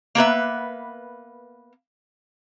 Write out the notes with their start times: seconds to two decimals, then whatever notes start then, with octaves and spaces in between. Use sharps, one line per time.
0.15 A#3 B3 B4 E5